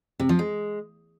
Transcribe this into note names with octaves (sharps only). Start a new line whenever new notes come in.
C3
F3
G#3